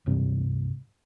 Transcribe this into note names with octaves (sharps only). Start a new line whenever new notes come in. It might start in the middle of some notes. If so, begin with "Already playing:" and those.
D1 C2 G2 C3